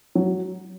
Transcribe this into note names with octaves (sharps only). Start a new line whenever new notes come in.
F#3